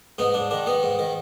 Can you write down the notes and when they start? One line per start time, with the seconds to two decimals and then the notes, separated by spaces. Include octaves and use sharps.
0.18 G#2 B3 D#4
0.34 G#2 D4
0.51 D#3 D4
0.66 D#3 B3
0.83 G#2
0.99 D#3